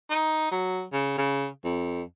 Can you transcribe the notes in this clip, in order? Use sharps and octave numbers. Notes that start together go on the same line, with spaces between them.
D#4
F#3
C#3
C#3
F2